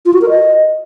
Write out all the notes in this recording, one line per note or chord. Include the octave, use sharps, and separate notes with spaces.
F4
F#4
A#4
D#5